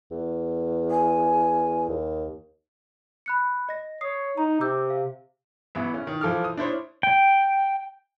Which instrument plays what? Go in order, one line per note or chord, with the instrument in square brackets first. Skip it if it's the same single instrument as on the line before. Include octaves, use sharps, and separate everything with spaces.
[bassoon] E2
[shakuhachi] G#5
[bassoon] D#2
[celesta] B5 F#6 C#7
D#5 A#6
[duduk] C#5 [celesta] D#6 C7
[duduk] D#4 [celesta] A#5
[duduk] C3 [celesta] D6 E6 G6
[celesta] F5
[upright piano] A1 E3 B3 E5
C#4
D#3
E3 F3 A4 D6 F6
D#6
D4 E4 C5 C#5
[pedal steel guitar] G5